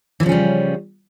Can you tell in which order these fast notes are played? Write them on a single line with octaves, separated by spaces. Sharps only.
E3 F3 C#3 C#4 G3